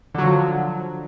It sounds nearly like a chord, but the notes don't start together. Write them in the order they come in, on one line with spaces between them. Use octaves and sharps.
D3 F#3 F3